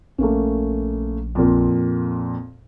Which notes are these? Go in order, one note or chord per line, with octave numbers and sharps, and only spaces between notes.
A#1 A3 A#3 C#4
F2 A#2